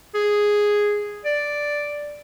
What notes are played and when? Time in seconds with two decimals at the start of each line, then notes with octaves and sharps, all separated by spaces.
0.15 G#4
1.26 D5